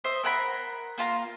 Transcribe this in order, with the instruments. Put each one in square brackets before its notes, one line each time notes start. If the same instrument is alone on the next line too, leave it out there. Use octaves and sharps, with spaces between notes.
[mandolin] C5 D#5 E5
A#4 F#5 G#5 B5
A#3 F4 A5 A#5